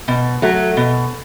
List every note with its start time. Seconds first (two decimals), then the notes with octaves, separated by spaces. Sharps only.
0.08 B2
0.42 F#3 A3
0.77 B2